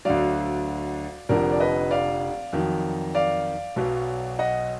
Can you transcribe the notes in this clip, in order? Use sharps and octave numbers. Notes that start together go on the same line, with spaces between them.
D2 D3 F#3 D5 F5
F1 F2 D3 F3 A#4 D5
D5
B4 D#5
D5 F5
F2 D#3 F#3
D5 F5
B1 B2 F#3
D#5 F#5